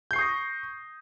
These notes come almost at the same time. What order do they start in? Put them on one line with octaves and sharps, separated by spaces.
G6 C7 C#6 D#6 A#6